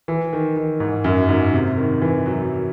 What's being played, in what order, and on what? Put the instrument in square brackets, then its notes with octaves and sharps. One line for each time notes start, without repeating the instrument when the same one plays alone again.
[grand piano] E3
D#3
D#3
G#2
F#2
G#2
C3
D#3
E3
F#3